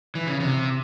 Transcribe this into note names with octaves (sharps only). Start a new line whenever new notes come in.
E3
C#3
C3